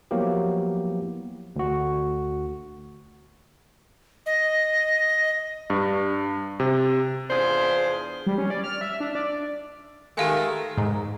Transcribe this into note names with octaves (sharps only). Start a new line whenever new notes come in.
F3 F#3 A#3 B3 E4 G4
D2 F#4
D#5
G2
C3
E2 D4 F4 G#4 C5
G3
C#4
D5
F6
E5
D4
D5
D#3 G#3 A3 G4 A#4 F5 G#5
G#2